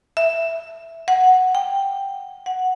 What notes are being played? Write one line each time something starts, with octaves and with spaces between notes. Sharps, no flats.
E5
F#5
G5
F#5